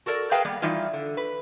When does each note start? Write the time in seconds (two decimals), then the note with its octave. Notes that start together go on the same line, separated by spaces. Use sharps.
0.06 F#4 A4 A#4 C#5 D5
0.31 G#4 A#4 B4 F5 G5 A5
0.45 G3 A#3 B3
0.62 E3 G3 D#4 F4
0.93 D3
1.17 B4